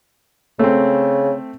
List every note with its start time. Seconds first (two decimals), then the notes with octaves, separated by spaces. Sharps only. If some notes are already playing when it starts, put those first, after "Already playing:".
0.59 C#3 A3 C4